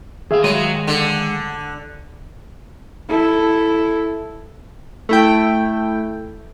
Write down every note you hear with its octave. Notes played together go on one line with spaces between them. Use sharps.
D#3 G#4 E5 F5
F#3 G#3 D#5 C6
D3
E4 A4
A3 E4 G5